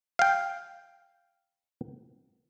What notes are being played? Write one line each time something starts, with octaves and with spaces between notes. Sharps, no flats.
F5 G5